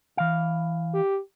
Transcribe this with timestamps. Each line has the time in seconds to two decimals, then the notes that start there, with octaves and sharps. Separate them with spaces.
0.17 E3 F5
0.94 G4